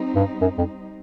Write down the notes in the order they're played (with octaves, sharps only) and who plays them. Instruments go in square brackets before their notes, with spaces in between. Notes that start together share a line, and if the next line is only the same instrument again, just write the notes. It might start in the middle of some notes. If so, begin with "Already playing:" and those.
Already playing: [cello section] G3 C4 D#4
[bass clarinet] G2
F#2
F2